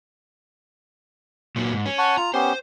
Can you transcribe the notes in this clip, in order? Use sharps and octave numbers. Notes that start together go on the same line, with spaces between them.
A#2 F#3
G#2
C#4
F#5 A5 C#6
F4 A#5
B3 C#4 G4 C5